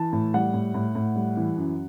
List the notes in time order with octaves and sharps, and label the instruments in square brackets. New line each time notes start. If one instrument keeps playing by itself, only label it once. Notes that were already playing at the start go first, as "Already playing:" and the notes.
Already playing: [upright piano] E3 A5
A2
G3 F#5
A2
A2
A2
G3
E3
F#2